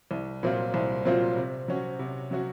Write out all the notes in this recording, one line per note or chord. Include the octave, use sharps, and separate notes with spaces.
C2
A#2 F#3 C4 F4
C2
A#2 F#3 C4 F4
C3
F#3 C#4 F#4
C3
F#3 C#4 F#4